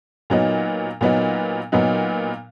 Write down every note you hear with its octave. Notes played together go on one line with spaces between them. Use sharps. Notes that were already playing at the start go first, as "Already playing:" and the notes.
A#2 F#3 B3 D#4
A#2 F#3 B3 D#4
A#2 F#3 B3 D#4